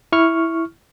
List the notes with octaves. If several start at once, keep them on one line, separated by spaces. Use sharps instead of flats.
E4 C#6 F6